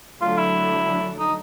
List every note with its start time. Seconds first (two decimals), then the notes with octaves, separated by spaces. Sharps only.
0.21 D3 F#3 A3 D4 F4
0.37 E4
1.18 D#4